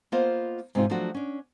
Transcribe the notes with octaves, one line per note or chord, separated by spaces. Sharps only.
A#3 B3 F4 C5 D#5 F5
G#2 C3 C4 D#4 F4
F3 F#3 A3 D4 F4 F#4
C#4 D4